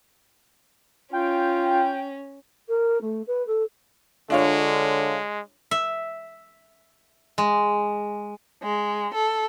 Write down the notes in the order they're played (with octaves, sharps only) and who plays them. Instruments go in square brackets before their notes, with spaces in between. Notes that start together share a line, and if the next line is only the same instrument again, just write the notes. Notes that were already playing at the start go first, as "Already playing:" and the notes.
[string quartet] C#4 [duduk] F4 [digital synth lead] G5
[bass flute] A#4
A3
B4
A4
[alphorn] D3 [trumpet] G#3 [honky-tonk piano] D4 F4 C#5
[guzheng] E5
G#3
[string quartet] G#3
A4